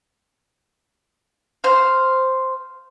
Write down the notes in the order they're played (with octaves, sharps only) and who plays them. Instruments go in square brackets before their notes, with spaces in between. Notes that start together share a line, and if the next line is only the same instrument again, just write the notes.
[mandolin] C5 F5